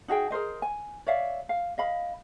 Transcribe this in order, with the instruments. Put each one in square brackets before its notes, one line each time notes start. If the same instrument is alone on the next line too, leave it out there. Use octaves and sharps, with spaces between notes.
[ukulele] D#4 F#4 G#4 G5
G#4 A#4 C5 D#5
G#5
C#5 D5 E5 F5
F5
D#5 F5 B5